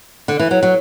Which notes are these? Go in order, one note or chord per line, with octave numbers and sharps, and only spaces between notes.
D3
E3
F#3
F#3